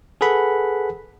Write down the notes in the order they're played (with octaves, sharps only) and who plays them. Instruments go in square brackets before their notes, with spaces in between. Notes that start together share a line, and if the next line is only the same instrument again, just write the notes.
[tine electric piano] G#4 A4 B4 F#5 B5